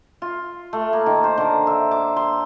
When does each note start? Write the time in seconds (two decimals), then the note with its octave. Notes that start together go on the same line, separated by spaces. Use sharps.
0.22 F4
0.73 A3
0.93 A#3
1.06 D#3
1.24 C5
1.38 D3
1.67 E5
1.91 D6
2.17 C6